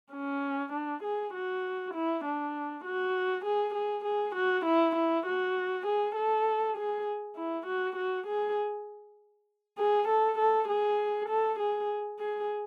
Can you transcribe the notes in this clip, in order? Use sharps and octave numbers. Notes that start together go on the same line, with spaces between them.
C#4
D4
G#4
F#4
E4
D4
F#4
G#4
G#4
G#4
F#4
E4
E4
F#4
G#4
A4
G#4
E4
F#4
F#4
G#4
G#4
A4
A4
G#4
A4
G#4
G#4